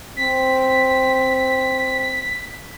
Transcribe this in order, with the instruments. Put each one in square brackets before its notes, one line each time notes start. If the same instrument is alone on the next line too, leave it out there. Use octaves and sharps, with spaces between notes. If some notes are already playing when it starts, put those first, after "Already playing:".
[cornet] C4 [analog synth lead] B6